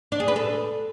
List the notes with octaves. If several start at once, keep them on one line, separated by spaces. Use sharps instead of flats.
D4
G#4
B4
A4